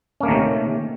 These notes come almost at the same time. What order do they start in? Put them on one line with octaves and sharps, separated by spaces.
C#4 A#3 A3 D#3 C3